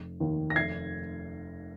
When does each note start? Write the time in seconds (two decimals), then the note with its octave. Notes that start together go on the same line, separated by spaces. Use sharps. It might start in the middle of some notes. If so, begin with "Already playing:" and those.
Already playing: F1
0.20 D#2 D#3
0.50 A#6
0.56 F1 G#6 C7